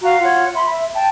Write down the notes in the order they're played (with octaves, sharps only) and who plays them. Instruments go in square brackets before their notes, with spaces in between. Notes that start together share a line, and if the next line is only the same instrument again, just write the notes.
[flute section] F#4 F5 A#5
F4 C#5 F#5
E5 B5 C6
E5
G5 A5